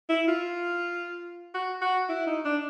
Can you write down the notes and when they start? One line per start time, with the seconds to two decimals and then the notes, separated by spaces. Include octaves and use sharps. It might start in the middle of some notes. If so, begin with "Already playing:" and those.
0.09 E4
0.28 F4
1.54 F#4
1.81 F#4
2.09 E4
2.27 D#4
2.45 D4